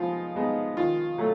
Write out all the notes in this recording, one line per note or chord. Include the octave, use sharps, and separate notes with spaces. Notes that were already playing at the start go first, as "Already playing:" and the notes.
Already playing: F3 G#3 B3 D#4 F4
G#3 B3 D#4
D#3 F4
F#3 A3